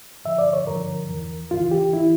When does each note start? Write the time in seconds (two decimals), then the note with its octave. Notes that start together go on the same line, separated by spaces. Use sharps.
0.25 G2 D3 F3 E5
0.38 D5
0.53 C#5
0.67 G2 D3 F3 A#4
1.09 E2 E3
1.50 C#2 C#3 E3 F4
1.71 G4
1.93 E3 E4